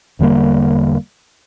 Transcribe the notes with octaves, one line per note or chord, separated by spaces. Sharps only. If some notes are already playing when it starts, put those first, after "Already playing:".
E1 D3 G3 A#3